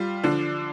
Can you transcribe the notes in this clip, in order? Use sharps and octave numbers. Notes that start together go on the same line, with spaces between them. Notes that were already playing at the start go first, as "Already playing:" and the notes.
Already playing: G3 F4
D3 F3 D4